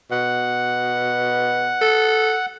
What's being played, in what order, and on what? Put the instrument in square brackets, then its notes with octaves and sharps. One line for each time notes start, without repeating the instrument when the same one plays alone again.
[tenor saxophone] B2 [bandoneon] F#5
[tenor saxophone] A4